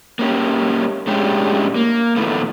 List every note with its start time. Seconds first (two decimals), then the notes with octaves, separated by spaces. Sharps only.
0.19 A#3 C#4 G4
1.07 A2 G#3 C#4 D4 G4
1.76 A#3
2.16 A2 D#3 E3 A3 B3